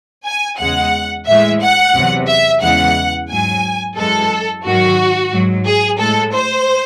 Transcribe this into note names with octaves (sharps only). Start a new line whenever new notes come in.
G#5
E2 C#3 G#3 F#5
A2 E3 G#3 E5
F#5
E2 C3 F#3
E5
E2 C#3 E3 G#3 F#5
G#2 F#3 G#5
F#2 E3 G#3 A4
G#2 D#3 F#3 F#4
G#2 F#3
G#4
A2 G#3 A4
C5